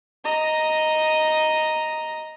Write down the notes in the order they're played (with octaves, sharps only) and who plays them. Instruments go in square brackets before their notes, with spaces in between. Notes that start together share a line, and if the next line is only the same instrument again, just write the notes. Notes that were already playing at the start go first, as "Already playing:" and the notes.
[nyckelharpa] D#5 A#5